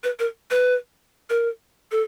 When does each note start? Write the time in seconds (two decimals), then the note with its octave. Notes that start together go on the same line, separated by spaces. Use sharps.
0.04 B4
0.19 A#4
0.51 B4
1.30 A#4
1.92 A4